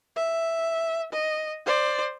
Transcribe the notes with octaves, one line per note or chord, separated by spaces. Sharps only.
E5
D#5
C5 D5